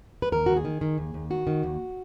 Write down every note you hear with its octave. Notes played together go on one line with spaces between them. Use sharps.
B4
D#2 A#4
D#2 F#4
G#4
D#3
D#3
D#2
D#2
D#3 F#4
D#3
D#2